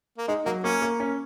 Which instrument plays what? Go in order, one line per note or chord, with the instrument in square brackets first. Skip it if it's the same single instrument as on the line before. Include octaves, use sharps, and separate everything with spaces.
[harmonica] A#3
[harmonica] G#3 [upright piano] D#4
[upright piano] F#3 [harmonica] A#3
[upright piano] A#3 [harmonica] C#4
[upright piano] A#3
C#4